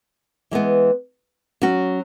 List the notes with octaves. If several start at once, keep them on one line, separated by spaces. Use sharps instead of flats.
E3 G#3 B3
F#3 C#4 F#4